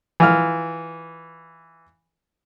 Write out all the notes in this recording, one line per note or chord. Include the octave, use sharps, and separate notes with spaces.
E3 F4 F6